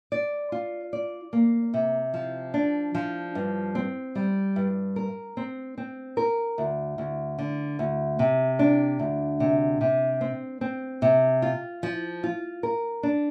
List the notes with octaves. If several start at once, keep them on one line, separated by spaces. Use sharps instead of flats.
D5
F4
D5
A#3
C3
F3
D4
F3
G2
C4
G3
G2
A#4
C4
C4
A#4
D2
D2
D3
D2
C3
D4
D2
C3
C3
C4
C4
C3
F4
F3
F4
A#4
D4